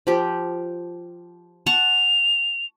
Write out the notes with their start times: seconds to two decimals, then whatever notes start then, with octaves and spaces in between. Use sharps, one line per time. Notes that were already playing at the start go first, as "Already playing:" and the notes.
0.07 F3 G4
1.66 F#5 A5 C#6 F7